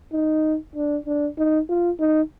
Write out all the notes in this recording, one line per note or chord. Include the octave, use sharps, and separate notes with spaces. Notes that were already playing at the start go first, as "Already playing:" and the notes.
D#4
D4
D4
D#4
F4
D#4